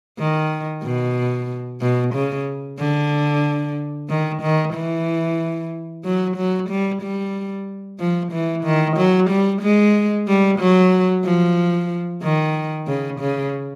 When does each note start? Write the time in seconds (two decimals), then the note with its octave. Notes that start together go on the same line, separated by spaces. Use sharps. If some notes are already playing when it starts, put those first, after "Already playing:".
0.19 D#3
0.83 B2
1.81 B2
2.14 C#3
2.79 D3
4.09 D#3
4.42 D#3
4.74 E3
6.04 F#3
6.37 F#3
6.69 G3
7.02 G3
8.00 F3
8.32 E3
8.64 D#3
8.97 F#3
9.30 G3
9.62 G#3
10.28 G3
10.59 F#3
11.24 F3
12.22 D#3
12.87 C#3
13.20 C#3